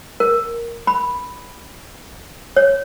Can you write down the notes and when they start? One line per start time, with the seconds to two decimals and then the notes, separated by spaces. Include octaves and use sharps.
0.20 A#4
0.87 B5
2.56 C#5